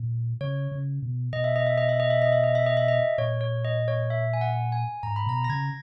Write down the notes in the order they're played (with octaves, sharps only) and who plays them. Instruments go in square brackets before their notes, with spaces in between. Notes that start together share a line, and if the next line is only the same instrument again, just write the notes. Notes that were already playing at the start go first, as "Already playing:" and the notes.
Already playing: [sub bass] A#2
[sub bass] C#3 [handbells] C#5
[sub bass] C#3
B2
[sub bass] B2 [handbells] D#5
[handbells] E5
D#5
E5
D#5
E5
D#5
E5
D#5
E5
D#5
E5
D#5
E5
D#5
[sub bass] A#2 [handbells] C#5
[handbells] C#5
D#5
C#5
E5
G#5
F#5
G#5
[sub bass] G#2 [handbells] A#5
[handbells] B5
[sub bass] B2 [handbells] A#5
[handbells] A#6
[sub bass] C#3 [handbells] G#6